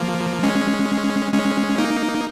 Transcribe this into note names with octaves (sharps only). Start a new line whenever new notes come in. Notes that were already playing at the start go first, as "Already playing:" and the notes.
Already playing: F3 A#3
G#3 C#4
G#3 C#4
A#3 D#4